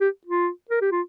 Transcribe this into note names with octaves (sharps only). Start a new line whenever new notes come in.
G4
F4
A#4
G4
F4